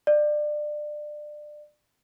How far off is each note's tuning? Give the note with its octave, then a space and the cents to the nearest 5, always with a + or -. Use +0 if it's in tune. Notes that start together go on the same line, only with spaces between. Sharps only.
D5 +25